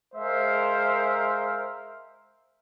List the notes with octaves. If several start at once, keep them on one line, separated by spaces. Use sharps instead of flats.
G#3 A#4 C5 E5 F5